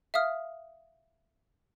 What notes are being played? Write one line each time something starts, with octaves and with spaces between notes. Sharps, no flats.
E5 F5 D#6 F6